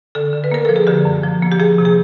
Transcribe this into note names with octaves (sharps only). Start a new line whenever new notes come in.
D3 A4
D3
B4
A#3 A#4
F3 A4
G#4
D3 G4
F#2
F3
A#3
G4
F3 G#4
C3
G#4